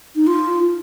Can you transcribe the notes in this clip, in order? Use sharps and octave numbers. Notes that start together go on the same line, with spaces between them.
D#4
F4